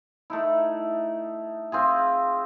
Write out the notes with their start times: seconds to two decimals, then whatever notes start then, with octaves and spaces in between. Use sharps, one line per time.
0.30 A3 D#4 E4
1.72 C4 F4 G#4